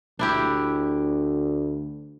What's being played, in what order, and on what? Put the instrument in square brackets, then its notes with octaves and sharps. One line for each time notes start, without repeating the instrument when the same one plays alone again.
[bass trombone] D2 [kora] D4 E4 G4